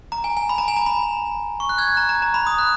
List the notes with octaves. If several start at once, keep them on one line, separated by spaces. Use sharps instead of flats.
A#5
G#5
G#5
B5
A#5
G#5
A#5
B5
C#6
F#6
F6 G#6
F#6
A#5
A#5
A#5
B5
D#6
F#6